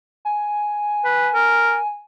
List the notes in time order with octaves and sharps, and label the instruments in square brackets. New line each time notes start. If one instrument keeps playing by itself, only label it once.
[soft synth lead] G#5
[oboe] B4
A#4